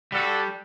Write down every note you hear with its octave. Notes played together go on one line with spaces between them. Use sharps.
G3 D4 F#4 A4